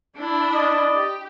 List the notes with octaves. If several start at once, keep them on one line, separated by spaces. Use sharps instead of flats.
D4 E4
D5 D#5
G4